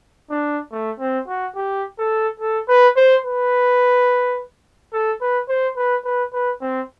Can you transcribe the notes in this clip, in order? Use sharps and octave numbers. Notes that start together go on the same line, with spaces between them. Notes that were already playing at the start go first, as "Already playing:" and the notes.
D4
A3
C4
F#4
G4
A4
A4
B4
C5
B4
A4
B4
C5
B4
B4
B4
C4